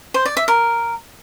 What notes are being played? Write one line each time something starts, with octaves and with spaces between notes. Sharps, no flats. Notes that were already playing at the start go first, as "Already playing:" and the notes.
C5
D5
E5
A#4